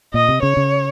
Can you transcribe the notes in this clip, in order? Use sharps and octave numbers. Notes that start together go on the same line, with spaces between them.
A#2 D#5
C3
C#3 C#5
C#3